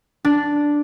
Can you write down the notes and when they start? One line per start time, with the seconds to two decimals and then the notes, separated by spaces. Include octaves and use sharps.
0.25 D4